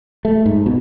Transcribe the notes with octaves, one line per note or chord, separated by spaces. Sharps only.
A3
G#2
B2